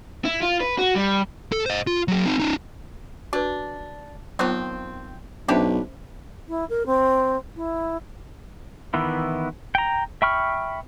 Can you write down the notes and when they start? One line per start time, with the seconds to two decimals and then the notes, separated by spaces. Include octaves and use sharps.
0.25 E4
0.42 F4
0.60 B4
0.78 F#4
0.95 G3
1.52 A4
1.66 C5 D#5
1.87 F4
2.08 F#3 G#4
2.25 C4 D#4
2.40 C#4 D#4
3.33 D4 F#4 B4
4.39 D#3 F3 F#3 B3 C4 F4
5.48 B1 C#4 D4 G4 B4 C5 E5
6.48 E4
6.69 A#4
6.86 C4
7.56 E4
8.94 D#3 E3 B3 E4
9.75 G5 A#5
10.22 E5 G5 B5 C#6 F6